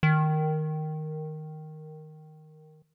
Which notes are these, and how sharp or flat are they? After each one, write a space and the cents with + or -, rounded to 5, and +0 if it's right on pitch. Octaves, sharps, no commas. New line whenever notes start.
D#3 -5